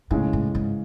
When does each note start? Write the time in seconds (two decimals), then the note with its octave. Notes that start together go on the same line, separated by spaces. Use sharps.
0.11 A2 C#3 E3 G#3 C#4
0.33 A2
0.55 G#2